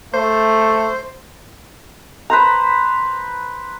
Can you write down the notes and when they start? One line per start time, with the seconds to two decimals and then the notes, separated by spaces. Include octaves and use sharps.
0.14 A3 C5
2.30 B4 C5 A#5